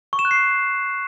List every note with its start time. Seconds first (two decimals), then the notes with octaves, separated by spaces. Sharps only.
0.13 C#6
0.19 E7
0.25 F#6
0.31 C7